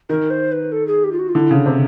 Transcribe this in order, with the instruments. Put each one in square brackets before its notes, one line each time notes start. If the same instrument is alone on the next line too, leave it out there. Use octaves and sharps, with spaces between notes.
[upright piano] D#3 [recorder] A#4
[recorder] C5
B4
A4
G#4
G4
F4
F#4
F4
[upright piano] D3 [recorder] E4
[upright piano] C#3
[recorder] D4
[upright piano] C3